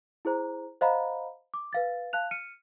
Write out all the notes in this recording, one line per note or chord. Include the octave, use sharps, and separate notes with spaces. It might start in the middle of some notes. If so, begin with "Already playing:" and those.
E4 G#4 C5 A#5
C5 D#5 F5 F#5 A#5 B5
D6
B4 F5 A6
F5 A5 F#6 F7
F6 C#7 D#7